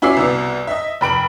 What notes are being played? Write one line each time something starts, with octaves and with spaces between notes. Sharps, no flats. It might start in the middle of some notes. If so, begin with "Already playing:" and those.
C#4 E4 F#4 D6 E6 C7
C2 B2
D#5 E5
F1 B5 D7 F#7